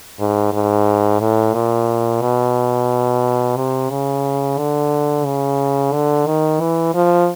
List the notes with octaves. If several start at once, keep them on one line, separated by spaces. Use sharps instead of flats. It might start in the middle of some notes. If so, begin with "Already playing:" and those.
G#2
G#2
A2
A#2
B2
C3
C#3
D3
C#3
D3
D#3
E3
F3